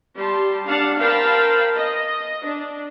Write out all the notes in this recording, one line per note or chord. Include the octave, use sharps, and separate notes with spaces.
G3 G4 A5 C6
D4 F5 F#5 A5
A#4 C5 F5 G5 A5 B5
D#5
D4